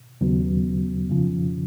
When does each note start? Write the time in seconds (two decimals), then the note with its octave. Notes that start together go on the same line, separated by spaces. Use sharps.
0.21 D#2 C#3 F#3 B3
1.09 F2 C#3 F3